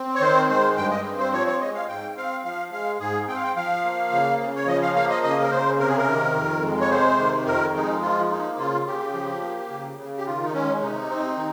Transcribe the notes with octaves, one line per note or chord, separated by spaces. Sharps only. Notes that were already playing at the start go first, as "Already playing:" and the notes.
Already playing: C4
C#5
D#3 C5
G#3 C5
G2 G5
D#5
C4
C5
F3 C#5
C#5
G#3 D#5
F5
G#2 G5
C4 F5
F3 F5
G#3 F5
G#2 G#4
C4 G5
F5
G5
F3 F5
A#3
C#3
C#3
C#5
F3 D#5
F5
A#3 F5
D#5
C#3 D#5
A#4
C#3 C5
C3 A#4
G#4
A#4
D#3
F2
G#3
C#5
C3 C5
D#3
F2 A#4
G#3 D#4
F3 F4
A#3 D#4
C#3 F4
C#3 G4
F3
A#3
C#3
C#3
G4
D#3 F4
D#4
G#3 C#4
C3 D#4
C4
D#3